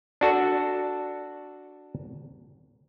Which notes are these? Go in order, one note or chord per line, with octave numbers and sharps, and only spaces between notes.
D4 F#4 A4